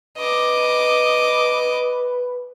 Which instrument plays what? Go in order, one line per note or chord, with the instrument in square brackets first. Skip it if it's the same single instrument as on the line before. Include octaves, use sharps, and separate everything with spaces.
[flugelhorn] B4 [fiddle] D#5 D6